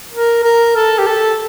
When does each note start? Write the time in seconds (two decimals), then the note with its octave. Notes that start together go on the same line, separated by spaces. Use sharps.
0.13 A#4
0.44 A#4
0.76 A4
0.99 G4
1.07 A4